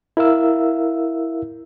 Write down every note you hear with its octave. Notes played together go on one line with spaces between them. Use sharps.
E4 A#4 E5 F5 E6